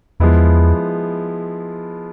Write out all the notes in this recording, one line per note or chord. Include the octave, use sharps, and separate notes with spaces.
E2 F3 G#3 B3 E4